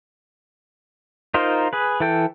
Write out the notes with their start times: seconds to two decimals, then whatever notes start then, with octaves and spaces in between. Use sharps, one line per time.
1.34 D#4 F4 A#4 C5
1.73 G#4 B4
2.00 E3 E4 A4 G5